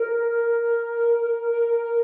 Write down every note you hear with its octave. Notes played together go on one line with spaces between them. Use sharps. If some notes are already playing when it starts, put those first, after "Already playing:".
Already playing: A#4